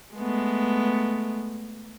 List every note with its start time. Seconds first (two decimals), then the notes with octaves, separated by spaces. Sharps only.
0.15 G#3 A3 B3